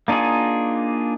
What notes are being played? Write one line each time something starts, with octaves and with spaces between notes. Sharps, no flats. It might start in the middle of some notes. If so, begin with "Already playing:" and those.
A#3 D4 D#4 F4 G#4